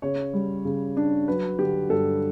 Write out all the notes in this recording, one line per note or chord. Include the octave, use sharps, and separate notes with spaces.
C#3 C#5
G3
C#3
D4
F#3 B4
D3 G4
G2 A4